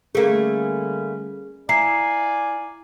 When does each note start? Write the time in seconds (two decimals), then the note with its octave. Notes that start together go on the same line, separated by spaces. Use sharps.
0.15 D3 G3 A3 A#3 C#4 G#4
1.69 E4 D5 F5 G#5 A#5 C7